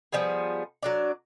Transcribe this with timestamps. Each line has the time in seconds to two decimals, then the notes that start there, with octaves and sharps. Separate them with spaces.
0.12 F3 G3 B3 G#4
0.83 F#3 D4 D5